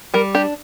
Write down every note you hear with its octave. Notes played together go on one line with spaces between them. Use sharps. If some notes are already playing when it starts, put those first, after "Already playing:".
G3 A#4
D4 G4